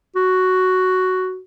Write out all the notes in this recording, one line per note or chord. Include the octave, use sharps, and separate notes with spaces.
F#4